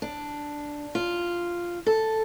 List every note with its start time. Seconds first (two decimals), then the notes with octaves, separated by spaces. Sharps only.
0.02 D4
0.95 F4
1.86 A4